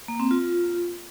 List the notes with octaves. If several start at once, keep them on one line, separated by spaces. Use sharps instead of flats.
A#3
C4
F4